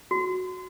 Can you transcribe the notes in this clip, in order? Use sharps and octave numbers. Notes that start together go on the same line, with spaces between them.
F#4